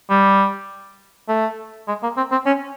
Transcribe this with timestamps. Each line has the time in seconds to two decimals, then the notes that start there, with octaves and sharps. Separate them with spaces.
0.10 G3
1.28 A3
1.88 G#3
2.03 A#3
2.17 C4
2.31 C4
2.46 C#4